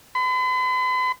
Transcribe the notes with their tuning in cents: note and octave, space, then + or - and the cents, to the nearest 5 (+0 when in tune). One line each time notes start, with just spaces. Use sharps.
B5 +45